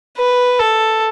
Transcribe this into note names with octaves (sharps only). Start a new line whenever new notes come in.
B4
A4